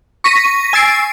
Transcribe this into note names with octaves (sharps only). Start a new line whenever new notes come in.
C#6 A#6 B6 D#7
G#5 E6 A6 C7 D7